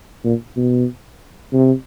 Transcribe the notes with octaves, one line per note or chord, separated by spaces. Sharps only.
A#2
B2
C3